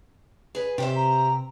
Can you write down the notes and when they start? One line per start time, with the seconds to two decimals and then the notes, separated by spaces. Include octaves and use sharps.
0.55 G#4 B4
0.78 C3 G4 C5 E5
0.96 A#5